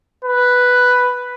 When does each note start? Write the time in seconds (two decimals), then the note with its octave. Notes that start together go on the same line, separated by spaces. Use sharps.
0.24 B4